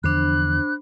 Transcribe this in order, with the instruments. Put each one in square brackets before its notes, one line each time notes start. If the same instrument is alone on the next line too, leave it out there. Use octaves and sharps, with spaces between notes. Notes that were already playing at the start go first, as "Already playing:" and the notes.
[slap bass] E2 D3 F3 [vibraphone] D4 C5 B5 [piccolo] F#6